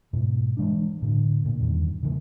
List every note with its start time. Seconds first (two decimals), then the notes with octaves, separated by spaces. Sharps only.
0.13 G#2 B2
0.57 E3 G#3 D4
1.02 A2 D3
1.45 A#2
1.60 E2 G2 D#3
2.03 C#3 E3 A#3